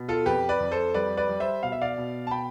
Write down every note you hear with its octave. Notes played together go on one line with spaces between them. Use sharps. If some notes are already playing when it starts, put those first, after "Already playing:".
Already playing: B2
F4 A4
F2 G4 B4
B4 D5
F2
A4 C5
G3 B4 D5
B4 D5
G3
C5 E5
B2 F5
E5
D5 F5
B2
A5
B2 G5 B5